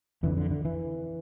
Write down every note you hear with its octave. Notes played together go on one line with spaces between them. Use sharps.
F2 D3 E3
D3
D3
E3